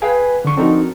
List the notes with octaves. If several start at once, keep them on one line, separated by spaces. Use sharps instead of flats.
G#4 B4 F5 G5 G#5
D3 D4 C#6
F3 C4 D4 D#4 F#4 A4 A#4